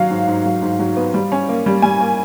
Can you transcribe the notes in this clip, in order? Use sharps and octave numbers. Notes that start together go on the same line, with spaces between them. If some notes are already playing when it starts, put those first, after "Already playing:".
Already playing: D#3 F#3 F5
G#2
G#2
F#3
G#2
F#3
B3
G3
C#4
A#3
G3
G3 G#5
A#3